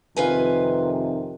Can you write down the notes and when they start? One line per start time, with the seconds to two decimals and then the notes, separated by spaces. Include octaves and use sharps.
0.17 F2 C3 D#3 F4 B4 G#5